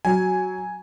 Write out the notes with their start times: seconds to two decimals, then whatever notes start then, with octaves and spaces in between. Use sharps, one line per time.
0.05 F#3 G#5